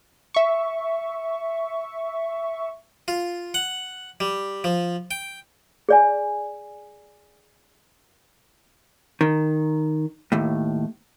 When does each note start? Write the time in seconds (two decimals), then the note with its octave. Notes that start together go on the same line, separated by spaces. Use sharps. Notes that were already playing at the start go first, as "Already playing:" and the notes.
0.34 E5 C#6
3.08 F4
3.54 F#5
4.20 G3
4.64 F3
5.11 G5
5.89 G#4 D5 G#5
9.21 D#3
10.32 D#2 A2